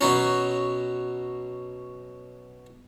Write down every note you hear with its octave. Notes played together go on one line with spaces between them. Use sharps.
B2 F#3 C#4